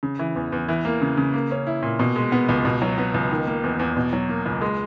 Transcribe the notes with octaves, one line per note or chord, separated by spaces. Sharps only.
C#3
E3
E2
E2
E3
A#3
C#3
C#3
A#3
C#4
E4
A#2
B2
G#3
B3
C#2
B2
F#3
B3
C#2
D#3
A#3
E2
E2
B2
F#3
A#3
C#2
G#3